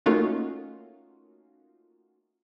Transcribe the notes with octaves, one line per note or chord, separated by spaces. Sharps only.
A3 A#3 C#4 D#4 F4 F#4